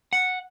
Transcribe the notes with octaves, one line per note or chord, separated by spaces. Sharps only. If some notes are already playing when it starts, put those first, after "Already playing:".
F#5